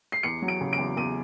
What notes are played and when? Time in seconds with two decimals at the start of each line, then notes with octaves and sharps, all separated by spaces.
0.12 C7
0.23 E2 C#7
0.42 F#3
0.48 D7
0.61 C#3
0.73 D7
0.78 E2
0.97 E2 D#7